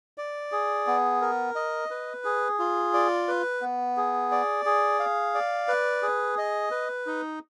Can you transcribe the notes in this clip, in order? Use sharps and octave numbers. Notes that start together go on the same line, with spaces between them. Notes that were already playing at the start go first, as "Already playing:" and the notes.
D5
G#4
B3
A#4
D#5
B4
G#4
F4
D5
B4
B3
G#4
D5
G#4
F5
D5
B4
G#4
D#5
B4
D#4